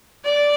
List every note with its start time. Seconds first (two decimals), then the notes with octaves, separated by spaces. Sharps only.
0.25 D5